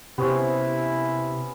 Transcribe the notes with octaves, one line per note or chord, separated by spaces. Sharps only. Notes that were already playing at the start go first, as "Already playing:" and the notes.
C3 B3 C#4 E4 C5